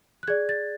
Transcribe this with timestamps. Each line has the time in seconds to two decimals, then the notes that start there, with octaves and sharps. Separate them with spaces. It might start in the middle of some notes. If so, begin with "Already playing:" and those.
0.23 F#6
0.28 G#4 D5 G#6
0.49 A6